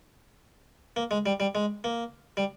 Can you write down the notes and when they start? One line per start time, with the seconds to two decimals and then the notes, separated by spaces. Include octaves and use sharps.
0.96 A#3
1.11 G#3
1.26 G3
1.40 G3
1.55 G#3
1.84 A#3
2.37 G3